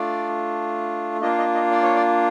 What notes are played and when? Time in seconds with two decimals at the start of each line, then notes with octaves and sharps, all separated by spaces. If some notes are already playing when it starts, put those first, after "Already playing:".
Already playing: A3 D4 F4 D5
1.21 A#3 D4 F4 D#5
1.38 D#5
1.54 D#5
1.71 D5
1.83 C#5
1.95 D5